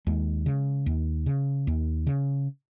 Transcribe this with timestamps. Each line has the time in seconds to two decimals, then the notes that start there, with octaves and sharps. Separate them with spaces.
0.07 D#2 G#3
0.46 C#3
0.86 D#2
1.26 C#3
1.67 D#2
2.07 C#3